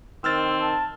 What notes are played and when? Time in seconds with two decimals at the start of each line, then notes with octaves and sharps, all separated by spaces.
0.24 D#3 C4 E6 F6 A6
0.62 A5